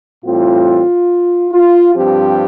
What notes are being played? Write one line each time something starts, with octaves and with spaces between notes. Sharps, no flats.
A2 E3 G3 C4 F4
F4
G2 F3 C4 G4